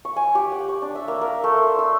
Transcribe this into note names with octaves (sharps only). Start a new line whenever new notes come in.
C#6
G#5
G4
F#5
C#6
D4
E5
A#3
A#4
A3
C6
E6